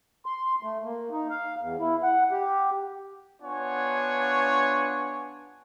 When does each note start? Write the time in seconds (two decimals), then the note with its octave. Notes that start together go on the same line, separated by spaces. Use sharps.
0.26 C6
0.63 A3
0.84 A#3
1.11 D#4
1.30 F5
1.61 E2
1.80 E4
2.03 F#5
2.31 G4
3.43 B3 D4 F4 C#5 F#5 G#5